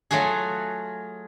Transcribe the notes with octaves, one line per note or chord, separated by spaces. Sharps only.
F#3 A3 F4 F#4 G#4